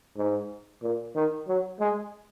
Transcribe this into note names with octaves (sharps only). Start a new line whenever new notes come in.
G#2
A#2
D#3
F#3
G#3